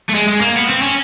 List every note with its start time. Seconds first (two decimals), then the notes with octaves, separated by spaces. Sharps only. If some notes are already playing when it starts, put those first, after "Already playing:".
0.10 A3
0.15 G#3
0.28 G#3
0.41 A#3
0.56 B3
0.70 C4
0.82 C#4